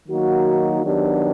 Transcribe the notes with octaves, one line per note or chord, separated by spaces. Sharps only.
D#3 F#3 A#3 D#4 F#4
D#3 F#3 B3 D4 G4